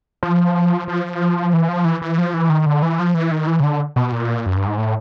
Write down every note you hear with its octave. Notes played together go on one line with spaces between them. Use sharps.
F3
F3
E3
F3
E3
E3
F3
E3
D#3
D3
E3
F3
E3
D#3
E3
C#3
D3
B2
A#2
F#2
G2
G#2
A2